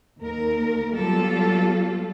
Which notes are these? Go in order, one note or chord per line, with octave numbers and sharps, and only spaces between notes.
D#2 A#4
F#3 G3 B3 F4 G4 A4